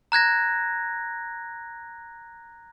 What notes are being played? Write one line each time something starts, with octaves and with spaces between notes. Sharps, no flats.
A#5 F#6 G#6 A#6